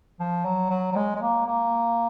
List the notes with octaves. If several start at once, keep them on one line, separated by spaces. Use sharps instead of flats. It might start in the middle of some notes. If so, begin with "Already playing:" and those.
F3
F#3
F#3
F#3
G#3
G#3
A#3
A#3